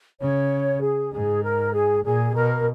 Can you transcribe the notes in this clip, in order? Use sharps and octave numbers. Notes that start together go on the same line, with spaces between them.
C#3 C#5
G#4
G#2 G#4
A#4
G#4
A#2 G#4
B2 A#4